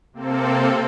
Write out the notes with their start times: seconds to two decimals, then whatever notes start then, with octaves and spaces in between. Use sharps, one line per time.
0.13 C3 A#3 C4 A4